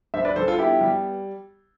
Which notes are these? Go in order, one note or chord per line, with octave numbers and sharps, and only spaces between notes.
G2 C5 E5
B4 D5
G2 A4 C5
F4 A4
B3 E4 G4
G3